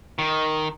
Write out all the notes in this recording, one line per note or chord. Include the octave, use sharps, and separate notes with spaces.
D#3